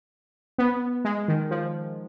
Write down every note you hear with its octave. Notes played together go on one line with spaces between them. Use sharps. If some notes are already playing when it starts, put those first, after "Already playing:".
B3
G#3
D#3
F3